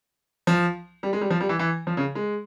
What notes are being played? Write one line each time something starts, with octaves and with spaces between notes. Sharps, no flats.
F3
G3
G#3
G3
F3
G3
E3
E3
F3
C#3
G#3